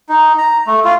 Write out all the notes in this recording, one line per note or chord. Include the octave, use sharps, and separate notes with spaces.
D#4
A#5
A3
F4